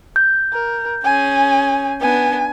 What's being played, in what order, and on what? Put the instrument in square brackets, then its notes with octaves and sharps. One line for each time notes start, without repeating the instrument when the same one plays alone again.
[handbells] G6
[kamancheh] A#4
[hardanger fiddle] C#4 G#4 [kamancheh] G#5
[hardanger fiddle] B3 D4 [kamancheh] G#5